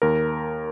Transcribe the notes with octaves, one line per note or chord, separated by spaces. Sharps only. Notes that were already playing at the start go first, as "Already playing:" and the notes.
D#2 A#4